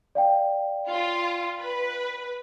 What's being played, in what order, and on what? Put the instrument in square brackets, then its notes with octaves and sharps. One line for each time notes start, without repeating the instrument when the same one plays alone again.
[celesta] D5 F5 G5
[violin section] F4
B4